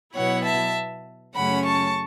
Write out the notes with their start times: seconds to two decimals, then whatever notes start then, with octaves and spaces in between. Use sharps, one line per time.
0.15 B2 F#3 B3 E4 C#5 F#5
0.45 E5 A5
1.35 F#2 C#3 A3 C#4 F#5 B5
1.65 A5 C#6